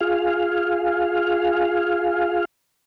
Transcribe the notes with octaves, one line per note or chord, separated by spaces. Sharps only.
F4 G#4 F5